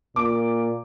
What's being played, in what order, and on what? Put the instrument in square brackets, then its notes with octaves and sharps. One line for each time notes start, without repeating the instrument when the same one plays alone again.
[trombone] A#2 [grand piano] D6